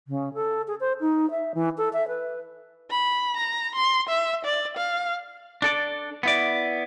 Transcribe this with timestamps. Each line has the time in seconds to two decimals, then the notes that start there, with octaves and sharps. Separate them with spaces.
0.08 C#3
0.34 A4
0.68 G#4
0.80 C5
1.00 D#4
1.31 E5
1.55 E3
1.78 A4
1.93 E5
2.08 B4
2.91 B5
3.37 A#5
3.75 C6
4.09 E5
4.45 D5
4.77 F5
5.62 D4 A4 D5
6.23 B3 E4 D5